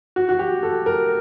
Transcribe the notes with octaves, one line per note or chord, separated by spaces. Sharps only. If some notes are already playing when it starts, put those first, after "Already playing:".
F#4
F#4
G4
A4
A#4